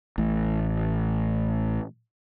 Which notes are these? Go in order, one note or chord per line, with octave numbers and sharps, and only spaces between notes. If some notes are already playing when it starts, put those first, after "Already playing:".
A1 A2